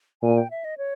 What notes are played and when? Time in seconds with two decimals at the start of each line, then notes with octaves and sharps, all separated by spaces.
0.22 A#2 G#5
0.37 G5
0.51 E5
0.64 D#5
0.78 C#5